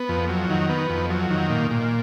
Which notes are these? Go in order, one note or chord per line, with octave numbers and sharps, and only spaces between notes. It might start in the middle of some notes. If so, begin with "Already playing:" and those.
Already playing: B3
F2
F#3
D#3
B3
F2
F#3
D#3
A#2
A#2